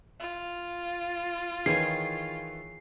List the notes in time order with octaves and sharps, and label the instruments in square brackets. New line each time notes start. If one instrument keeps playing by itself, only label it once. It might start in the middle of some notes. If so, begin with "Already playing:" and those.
[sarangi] F4
[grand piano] D#3 E3 [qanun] G#4 C#5 G#5 [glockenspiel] C7